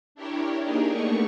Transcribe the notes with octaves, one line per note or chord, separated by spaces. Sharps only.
D4 E4 G4 A#4 C#5
A#3 D4 D#4 G4 G#4 A#4
A3 B3 C#6